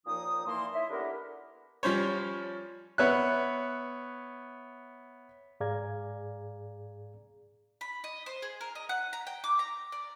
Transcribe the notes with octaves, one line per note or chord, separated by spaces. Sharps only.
D#2 A#2 F3 D#4 D#6
A#2 E3 A#3 A5 C6
D#4 E4 C#5 D#5 E5
B3 D4 E4 G4 A4 A#4
F3 G3 C#4 C5 C#5
B3 C#5 E5 F#6
G#2 G#4 D5 F5 A#5 G#6
B5
D#5
C5
G#4
A#4
D#5
F#5
A#5
G5
D6
A#5
D5